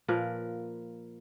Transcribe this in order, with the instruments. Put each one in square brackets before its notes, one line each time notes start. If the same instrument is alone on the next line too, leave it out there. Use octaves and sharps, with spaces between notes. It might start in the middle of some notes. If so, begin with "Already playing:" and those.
[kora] A#2 F3 A#4 B4